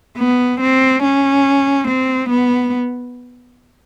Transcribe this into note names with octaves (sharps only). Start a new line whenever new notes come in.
B3
C4
C#4
C4
B3